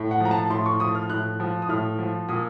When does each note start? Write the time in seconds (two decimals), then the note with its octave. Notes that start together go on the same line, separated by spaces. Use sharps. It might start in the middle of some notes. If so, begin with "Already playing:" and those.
Already playing: A2
0.11 F#5
0.20 F3 A#5
0.31 A5
0.50 A2 C6
0.66 C#6
0.80 F3 D#6
0.95 F6
1.09 A2 F#6
1.40 F3
1.62 D#6
1.69 A2 F6
1.99 F3
2.29 A#2 D#6